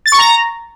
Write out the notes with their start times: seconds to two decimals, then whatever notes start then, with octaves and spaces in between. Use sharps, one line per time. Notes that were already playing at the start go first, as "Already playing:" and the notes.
0.06 A6
0.12 C#6
0.19 A#5